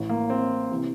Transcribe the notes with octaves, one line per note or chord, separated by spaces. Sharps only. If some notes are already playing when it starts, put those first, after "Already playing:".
Already playing: A1 A2 E3
A#3
C4
C3 E3